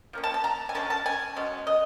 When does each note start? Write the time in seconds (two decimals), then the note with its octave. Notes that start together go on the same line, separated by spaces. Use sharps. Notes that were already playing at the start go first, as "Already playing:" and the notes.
0.13 F3 A#3 C#4
0.24 A5
0.34 A5
0.44 A#5
0.69 G#5
0.75 D3 F3 G#3 C#4 A5
0.90 A5
1.06 G#5
1.36 B2 G#3 C#4
1.67 D#5